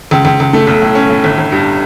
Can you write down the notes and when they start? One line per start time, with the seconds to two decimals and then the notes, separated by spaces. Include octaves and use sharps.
0.11 C#2
0.25 C#2
0.40 C#2
0.53 A3
0.67 B1
0.82 A2
0.95 C#4
1.10 A2
1.24 G1
1.38 G1
1.52 G2